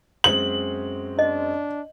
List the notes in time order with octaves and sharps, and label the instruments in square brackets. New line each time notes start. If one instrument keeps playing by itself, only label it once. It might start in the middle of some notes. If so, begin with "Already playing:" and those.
[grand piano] F#2 G#3 C4 [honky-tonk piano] F#7
[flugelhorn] D4 [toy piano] D#5